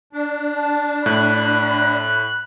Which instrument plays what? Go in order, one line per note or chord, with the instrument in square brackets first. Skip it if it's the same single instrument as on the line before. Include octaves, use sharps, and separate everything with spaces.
[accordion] D4
[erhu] A5
[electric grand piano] A2 [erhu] B5 [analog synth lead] F#6